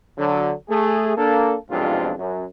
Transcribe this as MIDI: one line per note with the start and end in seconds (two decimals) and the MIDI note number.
0.19 0.53 50
0.19 0.53 54
0.70 1.14 57
0.70 1.14 68
1.17 1.55 58
1.17 1.55 62
1.17 1.55 69
1.70 2.11 35
1.70 2.11 41
1.70 2.11 44
1.70 2.11 48
1.70 2.11 62
1.70 2.11 65
2.18 2.45 42